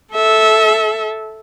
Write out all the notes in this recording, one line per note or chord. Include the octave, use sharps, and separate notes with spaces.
A4 E5